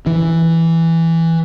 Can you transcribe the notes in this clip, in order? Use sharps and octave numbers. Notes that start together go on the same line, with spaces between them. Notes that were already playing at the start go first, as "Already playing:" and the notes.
E3